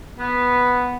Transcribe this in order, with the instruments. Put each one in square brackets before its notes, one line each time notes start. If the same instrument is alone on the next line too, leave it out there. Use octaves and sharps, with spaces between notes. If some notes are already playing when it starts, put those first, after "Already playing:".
[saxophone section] B3